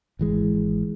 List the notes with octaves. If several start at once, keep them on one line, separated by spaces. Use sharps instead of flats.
G#1 E3 G#3